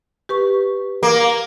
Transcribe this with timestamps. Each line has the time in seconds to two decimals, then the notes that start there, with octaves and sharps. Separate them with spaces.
0.29 G4 B4 C#6
1.03 A#3